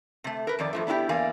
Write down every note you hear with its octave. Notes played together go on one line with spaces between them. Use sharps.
C3 A3
A#4 B4
F2 D#3 D5
G2 F3 A3
B3 D4 E4 F#4 G4
E2 A#3 D5 F5 G#5